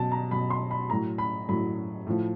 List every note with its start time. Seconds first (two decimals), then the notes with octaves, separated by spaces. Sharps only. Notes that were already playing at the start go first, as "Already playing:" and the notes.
Already playing: B2 F#3 A5
0.12 A#5
0.31 B2 F#3 B5
0.50 C6
0.71 B5
0.90 A2 F#3 A#5
1.18 B5
1.49 A2 F#3 B5
2.07 A2 F3